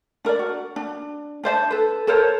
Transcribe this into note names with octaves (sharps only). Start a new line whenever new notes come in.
D4 A#4 C#5 D5
F#4
D4
D4 C5 D5 A5
A4 B4
A4 A#4 C5 C#5